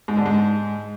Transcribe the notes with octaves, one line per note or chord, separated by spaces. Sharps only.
G#2
D3
G#2